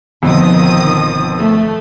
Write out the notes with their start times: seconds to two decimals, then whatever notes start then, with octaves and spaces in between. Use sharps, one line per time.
0.23 G1 F2 B2 D#3 F3 D#6
1.38 A3